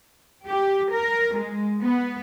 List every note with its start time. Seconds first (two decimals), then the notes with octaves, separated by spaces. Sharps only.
0.47 G4
0.92 A#4
1.36 G#3
1.82 B3